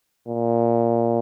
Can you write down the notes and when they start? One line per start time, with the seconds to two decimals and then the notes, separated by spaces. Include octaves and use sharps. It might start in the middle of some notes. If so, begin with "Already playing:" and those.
0.28 A#2